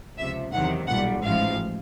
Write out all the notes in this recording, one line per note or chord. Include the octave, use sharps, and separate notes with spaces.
C#2 C3 F3 E5
E2 C3 D#3 F#3 F#5
B1 A#2 G3 F#5
A1 G#2 F3 G#3 F5